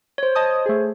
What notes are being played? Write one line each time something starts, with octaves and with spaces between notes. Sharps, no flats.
C5 C#5
D#5 A5 D#6
A3 G#4